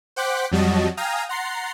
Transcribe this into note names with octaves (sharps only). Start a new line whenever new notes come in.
C5 F#5 G5 D6 F#6 B6
F2 F#3 G3 F#4 D#5 A5
F5 G5 G#5 A#5 D#6 F6
F#5 A#5 C6 A6 C7